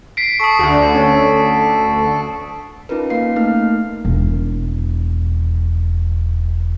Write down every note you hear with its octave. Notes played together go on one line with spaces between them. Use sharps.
B6 C7 D7
A4 C#6 D#6
D2 D3
C#4
C#4 D#4 F4 A#4 B4
A#3 F5 C7
A3 A#3 D#4 A#4 F6
E1 D#3